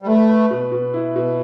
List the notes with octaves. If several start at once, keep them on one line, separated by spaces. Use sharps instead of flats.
G3
A3 B4
B4
B2
B2
E4
B2